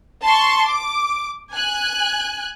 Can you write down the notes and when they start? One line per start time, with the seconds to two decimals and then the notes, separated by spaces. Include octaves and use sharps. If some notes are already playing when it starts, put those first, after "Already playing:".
0.24 A5 C6 C#6
0.65 D6
1.55 G#5 F#6